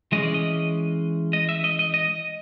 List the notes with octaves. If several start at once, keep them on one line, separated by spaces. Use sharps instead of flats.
E3 G#3 C#4 D#5
D5
D#5
D#5
E5
D#5
D#5
D#5